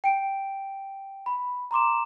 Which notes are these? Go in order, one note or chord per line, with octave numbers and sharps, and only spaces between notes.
G5 D7
B5
A#5 C6 D6 E7